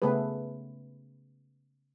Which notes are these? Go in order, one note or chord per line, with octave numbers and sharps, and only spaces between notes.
C#3 A3 B3 G#4 B4